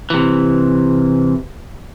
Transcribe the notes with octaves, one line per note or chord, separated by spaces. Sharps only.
C3 E3